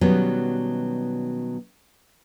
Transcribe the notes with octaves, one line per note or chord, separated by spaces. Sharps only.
B2 D#3 F#3 G3 B3 C#4